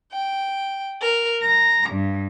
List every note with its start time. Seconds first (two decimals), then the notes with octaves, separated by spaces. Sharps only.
0.12 G5
1.02 A#4
1.42 A#5
1.90 G2